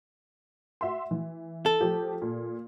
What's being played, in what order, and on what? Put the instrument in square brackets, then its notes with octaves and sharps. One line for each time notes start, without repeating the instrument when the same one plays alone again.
[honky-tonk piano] F#4 E5 C6
E3
[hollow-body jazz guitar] A4
[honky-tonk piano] F3 G4
A#2